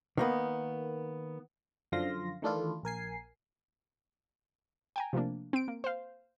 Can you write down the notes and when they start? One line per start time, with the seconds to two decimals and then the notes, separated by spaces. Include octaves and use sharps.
0.17 D#3 A#3 B3
1.92 F#2 D3 F3 F5 C6 A#6
2.42 D#3 E3 A3 D4 E4 F4
2.83 A#1 A#4 G#5 C7
4.96 G5 G#5 A#5
5.13 C3 F3 A3 A#3 D4
5.53 C4 D7
5.68 A#3
5.84 C5 F5